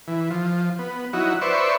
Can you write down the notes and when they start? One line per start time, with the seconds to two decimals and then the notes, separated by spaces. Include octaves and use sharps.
0.07 E3
0.30 F3
0.79 B3
1.13 F#3 D#4 E4 F#4
1.41 B4 C5 D5 E5 C#6